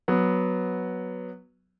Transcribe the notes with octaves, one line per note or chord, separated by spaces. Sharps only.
F#3 B3